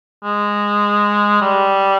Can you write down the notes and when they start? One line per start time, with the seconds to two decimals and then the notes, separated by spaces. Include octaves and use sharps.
0.24 G#3
1.42 G3